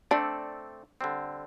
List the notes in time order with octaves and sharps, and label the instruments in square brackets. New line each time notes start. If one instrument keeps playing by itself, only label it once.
[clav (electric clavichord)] A3 C4 A4 D5 [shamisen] D4
[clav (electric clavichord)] D3 G3 C4